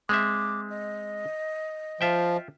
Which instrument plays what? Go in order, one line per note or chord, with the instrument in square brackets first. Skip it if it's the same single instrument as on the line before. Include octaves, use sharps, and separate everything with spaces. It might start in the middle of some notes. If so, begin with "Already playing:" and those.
[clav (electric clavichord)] G#3 C4 E5 [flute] D6
[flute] D#5
[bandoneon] F3 [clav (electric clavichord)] F4 E5 G5